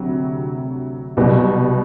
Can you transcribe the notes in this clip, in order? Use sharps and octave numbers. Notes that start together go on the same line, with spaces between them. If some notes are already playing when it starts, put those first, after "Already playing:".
Already playing: D2 C3 F#3
C2 B2 F#3